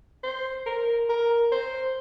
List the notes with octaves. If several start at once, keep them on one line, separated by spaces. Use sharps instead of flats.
C5
A#4
A#4
C5